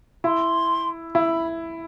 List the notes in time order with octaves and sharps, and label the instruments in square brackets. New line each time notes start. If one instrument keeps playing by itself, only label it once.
[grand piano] E4 [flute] C6
[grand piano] E4 [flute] B5